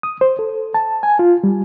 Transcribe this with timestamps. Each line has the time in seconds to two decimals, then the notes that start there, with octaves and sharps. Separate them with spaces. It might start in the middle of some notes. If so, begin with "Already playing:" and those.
0.03 D#6
0.21 C5
0.39 A4
0.74 A5
1.03 G#5
1.19 F4
1.44 G3